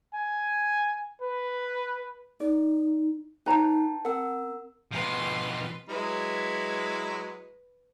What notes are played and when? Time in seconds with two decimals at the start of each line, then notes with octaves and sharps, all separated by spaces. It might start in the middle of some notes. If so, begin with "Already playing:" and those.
0.14 G#5
1.21 B4
2.40 D#4 D5
3.46 D#4 B4 C#5 G5 A5 A#5
4.05 C4 A#4 F#5 E6
4.92 B2 F3 B4 C6
5.89 F#3 G#3 E4 B4